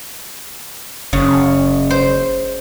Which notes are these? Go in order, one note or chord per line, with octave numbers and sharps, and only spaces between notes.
F#1 C#3
C5